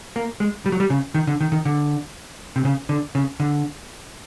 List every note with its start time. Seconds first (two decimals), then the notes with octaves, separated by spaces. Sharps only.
0.16 A#3
0.40 G#3
0.66 G3
0.72 F#3
0.80 G3
0.90 C#3
1.14 D#3
1.27 D3
1.41 D#3
1.52 D#3
1.65 D3
2.56 C3
2.65 C#3
2.89 D3
3.15 C#3
3.40 D3